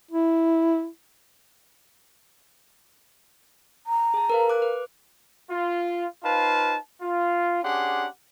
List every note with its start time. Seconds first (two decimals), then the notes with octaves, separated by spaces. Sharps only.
0.11 E4
3.87 A#5
4.14 G#4 A5
4.30 A#4 B4 F5
4.50 D6 F#6
4.62 B4
5.50 F4
6.23 D#4 F4 B4 C5 F5 A5
7.02 F4
7.63 C#4 D4 G4 G#4 F#5 C6